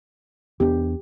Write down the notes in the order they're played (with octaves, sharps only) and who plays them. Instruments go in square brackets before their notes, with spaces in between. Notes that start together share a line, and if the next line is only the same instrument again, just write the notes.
[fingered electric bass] E2 B3 D4 [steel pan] G4